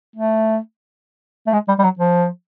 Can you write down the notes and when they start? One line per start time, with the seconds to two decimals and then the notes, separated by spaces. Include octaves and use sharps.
0.16 A3
1.47 A3
1.53 G#3
1.68 G3
1.79 G3
1.84 F#3
1.99 F3